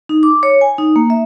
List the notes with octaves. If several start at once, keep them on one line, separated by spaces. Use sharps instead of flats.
D#4
D6
C#5
G#5
D#4
A#3
E5